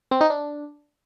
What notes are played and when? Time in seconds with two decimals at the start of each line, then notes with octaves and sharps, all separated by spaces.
0.11 C4
0.21 D#4
0.30 D4